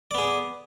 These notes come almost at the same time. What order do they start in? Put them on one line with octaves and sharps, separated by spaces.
D5 B3 G#4